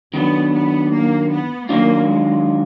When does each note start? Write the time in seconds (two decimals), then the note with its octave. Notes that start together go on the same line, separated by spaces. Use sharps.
0.14 D#3 F#3 B3 D4
0.52 B3
0.91 A#3
1.30 B3
1.69 D#3 F#3 A#3 D4 F4
2.08 G#3